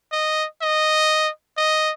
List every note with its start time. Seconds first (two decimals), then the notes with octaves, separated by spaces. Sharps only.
0.12 D#5
0.62 D#5
1.57 D#5